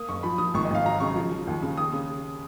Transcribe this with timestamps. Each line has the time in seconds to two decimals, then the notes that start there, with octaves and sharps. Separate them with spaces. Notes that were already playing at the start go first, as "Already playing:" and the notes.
Already playing: A#3 D#6
0.09 F#1 C#6
0.23 F3 B5
0.38 F3 D#6
0.54 G#1 C#6
0.65 D#5
0.70 G#1 F5
0.85 F#3 A#5
1.00 C#3 C#6
1.16 F3
1.32 F3
1.47 D#2
1.63 C#3
1.78 D#2 D#6
1.93 C#3